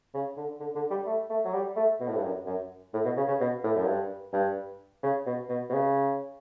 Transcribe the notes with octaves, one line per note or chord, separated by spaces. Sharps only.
C#3
D3
D3
D3
G3
A3
A3
F#3
G3
A3
B2
A2
G2
F#2
F#2
A2
B2
C#3
C#3
B2
A2
F#2
G2
G2
C#3
B2
B2
B2
C#3